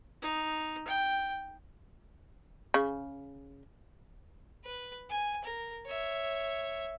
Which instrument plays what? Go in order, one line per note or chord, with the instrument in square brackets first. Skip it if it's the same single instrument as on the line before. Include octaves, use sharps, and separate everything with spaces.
[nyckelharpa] D#4
G5
[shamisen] C#3
[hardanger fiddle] B4
G#5
A#4
C#5 E5